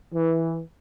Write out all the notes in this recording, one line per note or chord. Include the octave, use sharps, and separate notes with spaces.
E3